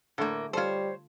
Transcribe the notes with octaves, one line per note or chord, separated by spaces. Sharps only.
A2 D3 A3 A#3
G3 F4 A4 C5 C#5